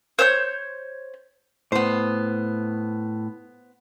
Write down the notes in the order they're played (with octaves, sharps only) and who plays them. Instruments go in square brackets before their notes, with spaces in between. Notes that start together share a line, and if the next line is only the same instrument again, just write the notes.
[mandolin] C5 C#5 F6 G6
[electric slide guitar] A2 [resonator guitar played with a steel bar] B3 C5